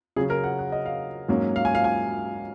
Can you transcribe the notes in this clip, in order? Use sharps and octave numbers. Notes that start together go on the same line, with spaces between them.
C#3 F#3 C#4 G#4
A#4
F#5
F#5
D#5
F5
G#2 F#3 A#3 C#4
F5
G#5
F5
G#5